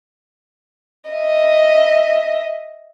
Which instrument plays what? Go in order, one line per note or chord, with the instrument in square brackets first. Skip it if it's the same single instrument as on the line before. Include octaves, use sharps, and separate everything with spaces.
[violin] D#5 E5